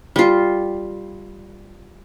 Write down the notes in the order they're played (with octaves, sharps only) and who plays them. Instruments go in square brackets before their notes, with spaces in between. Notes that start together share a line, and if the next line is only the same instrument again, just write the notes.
[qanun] G3 F4